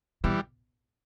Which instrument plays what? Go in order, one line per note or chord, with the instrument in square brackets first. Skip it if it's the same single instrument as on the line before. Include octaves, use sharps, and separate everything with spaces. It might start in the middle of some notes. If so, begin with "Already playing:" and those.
[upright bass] B2 [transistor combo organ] E3 G3